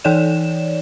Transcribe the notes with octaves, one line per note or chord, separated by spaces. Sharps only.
E3 D#4 C#5 D5 E7